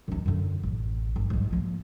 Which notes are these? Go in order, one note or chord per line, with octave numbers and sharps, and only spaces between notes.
F#2 D#4
F#2 D3
A1
G1
G#2 G3
F3 A#3